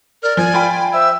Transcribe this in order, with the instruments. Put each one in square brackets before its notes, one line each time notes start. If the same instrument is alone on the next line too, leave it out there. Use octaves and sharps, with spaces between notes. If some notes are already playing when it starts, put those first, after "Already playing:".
[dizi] A#4 [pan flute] D5 [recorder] F6
[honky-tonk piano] F3 [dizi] G#5
[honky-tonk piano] F4 G5 B5
[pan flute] C5 [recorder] E5 [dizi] E6